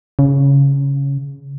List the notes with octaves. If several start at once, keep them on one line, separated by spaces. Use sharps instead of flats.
C#3